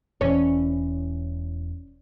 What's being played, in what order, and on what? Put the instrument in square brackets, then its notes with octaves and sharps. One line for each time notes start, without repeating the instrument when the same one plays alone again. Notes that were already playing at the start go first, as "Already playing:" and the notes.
[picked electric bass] E1 E3 [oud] C#4